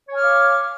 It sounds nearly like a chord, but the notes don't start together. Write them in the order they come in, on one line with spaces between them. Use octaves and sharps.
C#5 G#5 F6 D6 F5